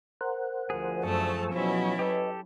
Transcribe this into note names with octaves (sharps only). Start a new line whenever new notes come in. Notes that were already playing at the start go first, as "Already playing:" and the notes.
A#4 C5 F#5
D2 F3 G#4
F#2 A3 C5 A5 C#6 E6
B2 F#3 C#4 E4
G4 A4 B4 D#5